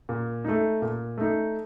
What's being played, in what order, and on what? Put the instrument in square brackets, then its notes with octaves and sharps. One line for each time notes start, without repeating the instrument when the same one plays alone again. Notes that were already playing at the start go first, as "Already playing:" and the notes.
[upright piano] A#2
A3 D#4
A#2
A3 D#4